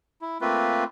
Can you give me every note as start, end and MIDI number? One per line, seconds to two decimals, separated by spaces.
0.22 0.38 64
0.41 0.84 57
0.41 0.84 58
0.41 0.84 60
0.41 0.84 65
0.41 0.84 71